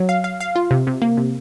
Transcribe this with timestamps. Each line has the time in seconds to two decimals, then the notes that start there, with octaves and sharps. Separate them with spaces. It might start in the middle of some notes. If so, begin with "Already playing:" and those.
Already playing: F#3
0.09 F5
0.24 F5
0.41 F5
0.56 F4
0.71 C3
0.87 C3
1.02 A#3
1.17 C3